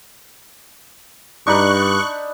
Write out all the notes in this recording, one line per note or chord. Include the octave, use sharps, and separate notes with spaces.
G2 D4 D#4 B5 C#6 F#6